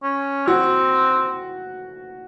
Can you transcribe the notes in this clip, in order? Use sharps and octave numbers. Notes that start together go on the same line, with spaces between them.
C#4
C4 F#4